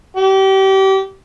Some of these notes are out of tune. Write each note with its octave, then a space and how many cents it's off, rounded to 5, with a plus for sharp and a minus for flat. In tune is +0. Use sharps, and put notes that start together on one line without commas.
G4 -30